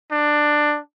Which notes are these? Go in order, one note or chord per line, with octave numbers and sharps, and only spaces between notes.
D4